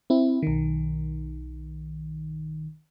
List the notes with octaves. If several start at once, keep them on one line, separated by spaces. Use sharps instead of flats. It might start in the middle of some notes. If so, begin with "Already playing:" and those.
C4 E4
B1 D#3